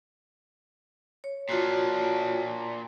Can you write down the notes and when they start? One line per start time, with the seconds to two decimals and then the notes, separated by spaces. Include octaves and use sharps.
1.24 C#5
1.49 A#2 D4 F4 F#4 C#5